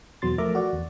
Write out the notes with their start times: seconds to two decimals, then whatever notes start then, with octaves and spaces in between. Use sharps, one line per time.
0.22 E2 B2 F#3 C6 A6
0.38 F3 A3 A#4 E5 A#5 D6
0.55 F#4 D5 F#5
0.73 E2